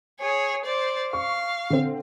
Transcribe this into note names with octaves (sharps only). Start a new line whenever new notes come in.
G#4 C#5
C5 D5
F5 C#6
D3 C4